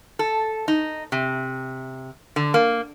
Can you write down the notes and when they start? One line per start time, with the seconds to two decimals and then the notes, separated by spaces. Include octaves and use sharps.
0.19 A4
0.68 D#4
1.12 C3
2.36 D3
2.54 A#3